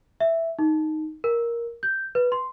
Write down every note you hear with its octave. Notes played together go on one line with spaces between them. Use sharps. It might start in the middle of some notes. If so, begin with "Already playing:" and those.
E5
D#4
A#4
G6
B4
C6